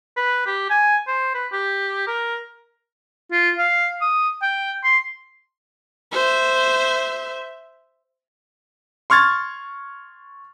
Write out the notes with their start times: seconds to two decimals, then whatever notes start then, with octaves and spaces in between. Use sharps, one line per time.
0.17 B4
0.47 G4
0.70 G#5
1.08 C5
1.34 B4
1.52 G4
2.07 A#4
3.32 F4
3.58 F5
4.01 D#6
4.42 G5
4.84 C6
6.12 C5 E5
9.10 C6 C#6 F6 G#6 A6